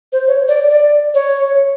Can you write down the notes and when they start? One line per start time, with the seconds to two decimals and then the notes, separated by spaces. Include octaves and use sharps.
0.13 C5
0.28 C#5
0.48 D5
0.71 D5
1.14 C#5